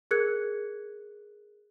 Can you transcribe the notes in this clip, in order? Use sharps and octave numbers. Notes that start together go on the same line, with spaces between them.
G#4 A#4 F#6 G#6 C#7